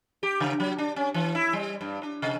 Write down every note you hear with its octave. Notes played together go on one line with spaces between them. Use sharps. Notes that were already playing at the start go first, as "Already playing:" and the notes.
G4
C#3
F#3
D4
C#4
E3
E4
G3
G2
D4
C3